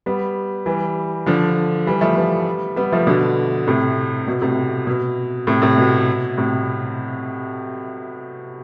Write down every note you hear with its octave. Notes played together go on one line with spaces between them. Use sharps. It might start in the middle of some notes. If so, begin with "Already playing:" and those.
G3 B3
E3 G3
D3 F3
E3 G3
F3 A3
G3 B3
G3 B3
F3 A3
B2 D3
A2 C3
B2
A2 C3
B2
A2 C3
A2 C3
B2
A2 C3